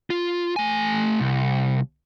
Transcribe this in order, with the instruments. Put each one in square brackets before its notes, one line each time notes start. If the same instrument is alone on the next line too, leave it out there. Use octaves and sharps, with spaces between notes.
[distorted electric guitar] F4
A3 G#5
C2